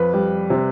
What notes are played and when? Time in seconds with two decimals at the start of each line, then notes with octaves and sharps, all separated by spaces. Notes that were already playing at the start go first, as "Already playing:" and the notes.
Already playing: F2 B4
0.14 G3
0.50 C3